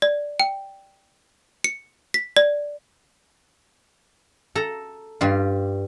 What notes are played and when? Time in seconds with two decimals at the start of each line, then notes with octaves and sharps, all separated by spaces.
0.02 D5
0.40 G5
1.64 C#7
2.14 B6
2.37 D5
4.55 A4 A#5
5.21 G2 G3 F4